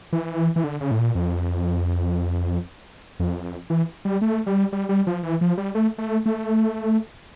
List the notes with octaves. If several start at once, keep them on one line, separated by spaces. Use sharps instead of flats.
E3
E3
D3
C#3
A2
A#2
F2
F2
E3
G3
A3
G3
G3
G3
F3
E3
F3
G3
A3
A3
A3